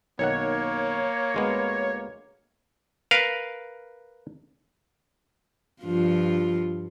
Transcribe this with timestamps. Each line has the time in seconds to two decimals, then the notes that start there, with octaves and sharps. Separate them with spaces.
0.19 B1 D#3 A#3 C#5 F#5
1.34 D2 G#3 B3
3.11 A#4 B4 F5
5.83 G2 F3 F4